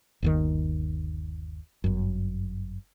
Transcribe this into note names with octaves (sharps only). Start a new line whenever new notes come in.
G1 D#2 D#3
G1 F#2